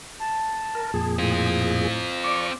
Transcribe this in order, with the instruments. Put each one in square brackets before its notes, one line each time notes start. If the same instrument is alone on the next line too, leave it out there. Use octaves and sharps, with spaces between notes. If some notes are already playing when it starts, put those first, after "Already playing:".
[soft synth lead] A5
[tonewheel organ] A#4
F2 A#2 G#4
[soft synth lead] A2 [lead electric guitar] C4 F4
[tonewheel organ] D5 C#6 [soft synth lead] D6